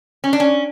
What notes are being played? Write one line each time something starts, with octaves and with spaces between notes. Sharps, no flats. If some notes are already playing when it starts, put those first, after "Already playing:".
C#4
D4
C#4